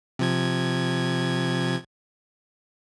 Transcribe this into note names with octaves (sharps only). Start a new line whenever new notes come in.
C3 F3 G#6